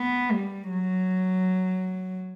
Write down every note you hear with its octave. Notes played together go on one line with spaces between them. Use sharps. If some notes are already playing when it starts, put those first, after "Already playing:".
Already playing: B3
G3
F#3